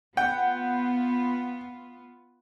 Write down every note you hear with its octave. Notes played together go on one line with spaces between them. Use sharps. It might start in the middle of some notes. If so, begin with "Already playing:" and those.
B3 F4 F#5 G5